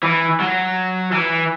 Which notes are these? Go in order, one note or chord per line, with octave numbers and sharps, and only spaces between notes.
E3
F#3
E3